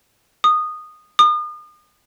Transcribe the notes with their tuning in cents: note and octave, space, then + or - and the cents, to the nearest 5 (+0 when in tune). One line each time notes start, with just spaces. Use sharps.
D#6 -15
D#6 -40